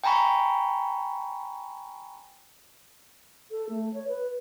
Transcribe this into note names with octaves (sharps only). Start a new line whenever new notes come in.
G5 G#5 A#5 B5 C#6
A4
A3
C#5
B4